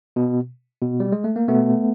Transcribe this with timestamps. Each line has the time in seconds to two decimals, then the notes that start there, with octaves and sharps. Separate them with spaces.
0.16 B2
0.82 B2
1.00 G3
1.12 G#3
1.24 A3
1.36 A#3
1.48 B2 A3 B3